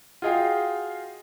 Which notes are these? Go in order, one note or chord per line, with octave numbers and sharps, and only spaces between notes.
F4 F#4 G#4 D#5 F5 G5